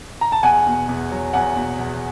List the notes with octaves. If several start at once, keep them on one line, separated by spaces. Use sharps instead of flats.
A#5
A5
E2 F#5 G#5
B2
E2
F#3
E2 F#5 G#5
B2
E2